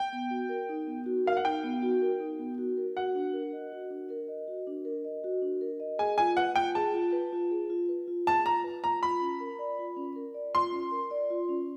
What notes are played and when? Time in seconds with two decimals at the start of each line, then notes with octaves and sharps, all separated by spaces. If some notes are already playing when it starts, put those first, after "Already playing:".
Already playing: G5
0.13 B3
0.31 F#4
0.49 A#4
0.69 D#4
0.87 B3
1.06 F#4
1.26 A#4 F5
1.37 F#5
1.45 D#4 G5
1.64 B3
1.82 F#4
2.02 A#4
2.20 D#4
2.39 B3
2.58 F#4
2.77 A#4
2.97 F#4 F#5
3.15 D4
3.33 A#4
3.53 D#5
3.72 F#4
3.90 D4
4.10 A#4
4.28 D#5
4.48 F#4
4.67 D4
4.85 A#4
5.04 D#5
5.24 F#4
5.42 D4
5.61 A#4
5.80 D#5
5.99 G#4 G#5
6.18 F4 G#5
6.37 B4 F#5
6.56 F4 G5
6.75 G#4 A5
6.94 F4
7.13 B4
7.32 F4
7.51 G#4
7.70 F4
7.89 B4
8.08 F4
8.26 G#4 A5
8.45 F4 A#5
8.64 B4
8.84 F4 A#5
9.02 F4 B5
9.21 C#4
9.40 A#4
9.59 D5
9.79 F4
9.97 C#4
10.16 A#4
10.34 D5
10.54 F4 C6
10.72 C#4
10.92 A#4
11.11 D5
11.30 F4
11.49 C#4